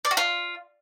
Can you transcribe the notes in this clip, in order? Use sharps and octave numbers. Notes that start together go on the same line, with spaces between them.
D5
F#4
F4